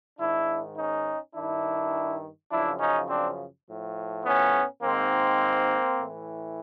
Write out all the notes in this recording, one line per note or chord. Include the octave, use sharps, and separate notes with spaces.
G#2 D#3 D4 E4
C#4 D#4
G2 D#3 D4 E4
F#2 C#3 F3 D4 E4
C#4 D#4
C4 D4
A2 F3
B3 C#4
G#2 D#3 A#3 C4
A2 E3